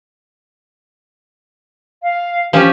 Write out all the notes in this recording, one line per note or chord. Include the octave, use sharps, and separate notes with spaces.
F5
F3 C#4 G4